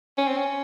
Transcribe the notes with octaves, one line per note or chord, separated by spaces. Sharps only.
C#4
C4
C#4